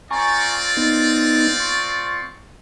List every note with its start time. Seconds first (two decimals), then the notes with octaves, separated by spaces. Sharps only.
0.11 C4 F4 D5 G#5 A#5 C#6
0.77 B3 D#4
1.60 C6 C#6